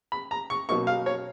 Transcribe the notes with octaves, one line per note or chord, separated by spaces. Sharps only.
B5
A#5
C#6
B2 F#3 A#3 D#4 C#6
F5
C#5